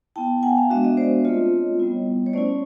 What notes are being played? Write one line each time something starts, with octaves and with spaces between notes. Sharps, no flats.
B3 E4 G5 A5
F#5 G#5
F5
G#3 B3 D4 F#4 E5
D#5
C5 D5
A3 C4 F4 C#5 D#5
G3 B3 E4
C#5
A3 C#4 E4 C5 D5